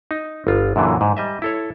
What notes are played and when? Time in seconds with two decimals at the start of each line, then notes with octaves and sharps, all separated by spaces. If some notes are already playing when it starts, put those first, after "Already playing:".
0.11 D#4
0.47 G1 F4
0.76 F#2 A#2 D3 E3 F#3
1.01 G#2
1.17 G3 D#5 E5
1.42 E4 A4 C#5